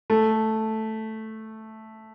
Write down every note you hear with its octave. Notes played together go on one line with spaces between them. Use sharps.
A3